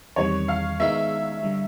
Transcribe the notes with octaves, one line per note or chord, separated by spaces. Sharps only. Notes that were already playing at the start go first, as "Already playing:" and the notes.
E2 C3 D#3 G3 C#5
F5
D#3 G#3 B3 D#4 E5
D3 G3